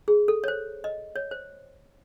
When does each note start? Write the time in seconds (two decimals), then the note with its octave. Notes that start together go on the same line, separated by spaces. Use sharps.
0.08 G#4
0.28 A4
0.44 C#5
0.48 C5
0.84 D#5
1.16 C#5
1.31 C5